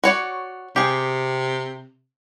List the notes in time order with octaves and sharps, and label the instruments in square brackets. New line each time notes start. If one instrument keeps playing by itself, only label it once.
[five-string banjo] F#4 C#5 D5
[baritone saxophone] C3 [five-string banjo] G4 G#4